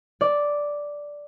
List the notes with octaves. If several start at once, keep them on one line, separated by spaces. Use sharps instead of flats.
D5